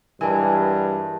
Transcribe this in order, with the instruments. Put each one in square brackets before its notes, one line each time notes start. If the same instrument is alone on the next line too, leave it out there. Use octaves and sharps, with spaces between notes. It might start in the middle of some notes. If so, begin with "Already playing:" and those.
[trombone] G2 [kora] E3 G#3 [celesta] A#4 A5